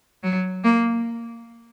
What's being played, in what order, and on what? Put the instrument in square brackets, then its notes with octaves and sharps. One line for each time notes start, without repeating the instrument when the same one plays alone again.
[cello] F#3
A#3